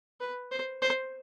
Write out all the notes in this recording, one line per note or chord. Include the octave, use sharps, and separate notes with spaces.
B4
C5
C5